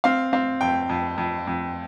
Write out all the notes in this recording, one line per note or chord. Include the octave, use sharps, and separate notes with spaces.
C4 F5
C4 F5
F2 G5
F2
F2
F2